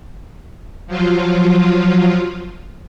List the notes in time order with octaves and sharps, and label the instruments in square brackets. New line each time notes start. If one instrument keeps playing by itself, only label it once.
[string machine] F3 F#3 F4